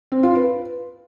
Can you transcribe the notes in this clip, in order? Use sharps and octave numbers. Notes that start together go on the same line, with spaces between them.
C4
F4
B4